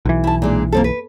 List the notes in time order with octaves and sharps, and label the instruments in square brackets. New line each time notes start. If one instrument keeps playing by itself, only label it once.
[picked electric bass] B1 E3
[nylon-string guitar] E4 A5
A#2 G#3 D4
A#3 C4 A4
B4